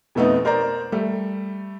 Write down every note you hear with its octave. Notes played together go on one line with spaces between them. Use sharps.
F2 B2 A3 B3 D#4
A#4 C5 D5 A#5
G3 A3